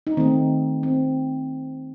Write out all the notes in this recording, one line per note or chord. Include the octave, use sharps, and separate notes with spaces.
D#4
D#3 A3 C4
C4